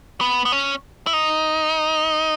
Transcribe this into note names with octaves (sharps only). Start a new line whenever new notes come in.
B3
B3
C#4
E4
D#4